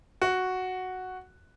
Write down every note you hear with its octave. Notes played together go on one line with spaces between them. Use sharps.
F#4